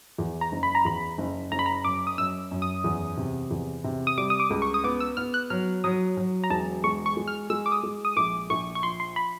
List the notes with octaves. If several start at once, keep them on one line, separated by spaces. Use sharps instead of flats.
E2
A#5
F#1
B5
A#5
E2 B5
F#1
F#1 A#5
B5
A#5
F#2 D6
D#6
F#2 E6
F#2
D#6
E2
C3
E2
C3
D#6
G3 D6
D#6
D6
C#2
C#6
D#6
B3 D6
E6
B3 F6
F#6
F#3 F6
F#3 D#6
F#3
A#5
E1 A5
G#3 C#6
C#6
G#3
F6
G#3 E6
D6
D#6
G#3
D#6
A#1 D6
A#1 C#6
C#6
F3 C6
C6
B5